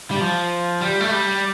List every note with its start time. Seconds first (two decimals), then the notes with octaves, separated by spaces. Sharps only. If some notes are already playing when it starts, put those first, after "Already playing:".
0.11 G3
0.21 F3
0.81 G3
1.01 A3
1.11 G3